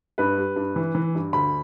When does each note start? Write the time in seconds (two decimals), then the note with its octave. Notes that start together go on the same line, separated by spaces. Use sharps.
0.18 G2 B4
0.38 G3
0.56 G2
0.76 E3
0.95 E3
1.15 G2
1.33 D2 B5